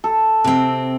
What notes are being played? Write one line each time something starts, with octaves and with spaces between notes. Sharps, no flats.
A4
C3 C4